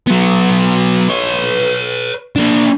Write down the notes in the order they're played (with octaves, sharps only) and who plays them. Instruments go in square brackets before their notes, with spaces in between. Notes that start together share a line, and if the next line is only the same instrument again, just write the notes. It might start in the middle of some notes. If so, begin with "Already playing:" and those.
[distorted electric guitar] F#3 B3
B4 C#5
A#3 D4